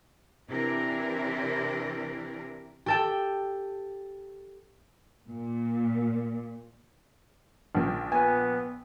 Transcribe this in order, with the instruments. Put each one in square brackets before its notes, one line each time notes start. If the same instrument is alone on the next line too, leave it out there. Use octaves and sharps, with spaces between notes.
[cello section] C3 E3 C4 D4 E4 A#4
[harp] G4 A4 G5
[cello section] A#2
[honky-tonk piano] A#1 F3
[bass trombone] B3 [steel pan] G#5